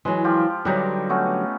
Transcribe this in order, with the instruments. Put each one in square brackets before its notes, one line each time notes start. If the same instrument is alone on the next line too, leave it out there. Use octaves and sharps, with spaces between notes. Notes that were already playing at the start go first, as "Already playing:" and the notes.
[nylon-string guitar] E3 F#3 [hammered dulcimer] G#3
[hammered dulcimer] F3 F4 G4
[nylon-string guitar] D3 F#3 G3 [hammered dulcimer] D#4 G4 B4
[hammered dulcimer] A3 B3 C#4